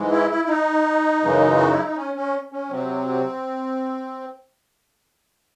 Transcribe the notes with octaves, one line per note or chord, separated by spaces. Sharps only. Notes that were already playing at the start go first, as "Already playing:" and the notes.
Already playing: G#2 E3 G#3
E4
E4
E4
D#4
F#2 C#3 E3 G#3
F#4
E4
D#4
C#4
C#4
C#4
C3 F#3 C4